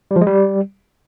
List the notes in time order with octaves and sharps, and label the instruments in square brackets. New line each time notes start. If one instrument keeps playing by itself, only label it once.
[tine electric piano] G3
F3
G#3
G3